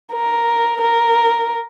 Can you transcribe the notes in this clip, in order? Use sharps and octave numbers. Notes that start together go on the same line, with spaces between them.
A#4
A#4